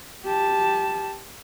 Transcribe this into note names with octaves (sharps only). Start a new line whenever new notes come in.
G4 A5